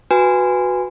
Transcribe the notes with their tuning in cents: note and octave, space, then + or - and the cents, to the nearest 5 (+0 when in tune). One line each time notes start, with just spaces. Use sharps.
F#4 -10 B4 +0 G#5 -10